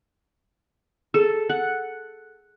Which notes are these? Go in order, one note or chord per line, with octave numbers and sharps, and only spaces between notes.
G#4 A4
F#5